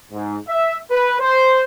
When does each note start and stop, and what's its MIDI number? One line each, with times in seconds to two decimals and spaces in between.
0.11 0.36 44
0.48 0.77 76
0.91 1.14 71
1.20 1.63 72